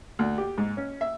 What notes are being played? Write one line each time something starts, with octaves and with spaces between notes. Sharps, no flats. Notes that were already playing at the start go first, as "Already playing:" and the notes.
D2
G4
G#2
C#4
E5